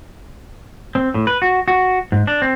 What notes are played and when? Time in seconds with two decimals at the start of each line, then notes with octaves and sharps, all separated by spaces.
0.95 C4
1.14 A2
1.27 B4
1.42 F#4
1.68 F#4
2.12 G#2
2.27 D4
2.42 C4